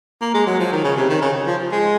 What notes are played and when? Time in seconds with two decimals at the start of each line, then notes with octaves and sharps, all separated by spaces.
0.21 A#3
0.34 G#3
0.46 F#3
0.59 F3
0.72 D#3
0.84 C#3
0.96 C3
1.09 D#3
1.21 C#3
1.47 F3
1.72 G#3